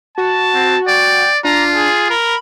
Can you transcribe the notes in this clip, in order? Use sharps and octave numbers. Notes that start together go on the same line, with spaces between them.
F#4 A5
C4
D5 G5
D4 F4 A#5
G#4
A#4 B5